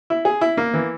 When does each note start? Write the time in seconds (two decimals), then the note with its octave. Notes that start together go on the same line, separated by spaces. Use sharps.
0.10 E4
0.25 G#4
0.41 E4
0.57 A#3
0.74 E3